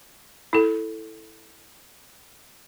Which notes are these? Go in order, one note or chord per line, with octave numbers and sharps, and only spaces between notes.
E4 A4